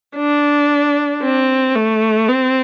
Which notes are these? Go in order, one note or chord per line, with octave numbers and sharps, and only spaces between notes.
D4
C4
A3
C4